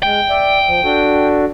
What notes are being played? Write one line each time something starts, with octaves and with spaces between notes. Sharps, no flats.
G#3 G5
D5 E5
F3
D4 F#4 A4